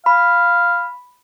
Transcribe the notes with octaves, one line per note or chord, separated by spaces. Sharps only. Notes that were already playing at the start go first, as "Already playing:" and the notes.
F5 B5